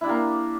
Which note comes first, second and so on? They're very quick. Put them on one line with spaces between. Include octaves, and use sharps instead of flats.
E4 D4 G4 A#3